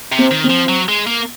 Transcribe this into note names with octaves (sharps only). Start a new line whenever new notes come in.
C3
C4
D#3
C4
F3
F#3
G#3
A#3